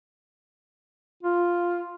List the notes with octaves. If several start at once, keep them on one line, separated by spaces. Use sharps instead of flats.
F4